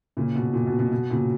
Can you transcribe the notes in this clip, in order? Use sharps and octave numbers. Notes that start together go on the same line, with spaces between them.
A#2 C#3
B2
A#2
B2
B2
B2
A#2 C#3